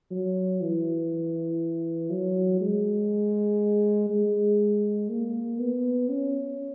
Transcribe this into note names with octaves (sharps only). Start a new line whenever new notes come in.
F#3
E3
F#3
G#3
G#3
A#3
B3
C#4